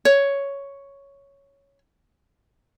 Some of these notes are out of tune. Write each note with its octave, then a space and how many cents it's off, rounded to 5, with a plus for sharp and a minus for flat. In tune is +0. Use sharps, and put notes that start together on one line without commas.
C#5 +5